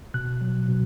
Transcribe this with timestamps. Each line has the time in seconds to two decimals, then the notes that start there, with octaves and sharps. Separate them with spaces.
0.14 B2 F#6
0.41 F#3
0.69 B2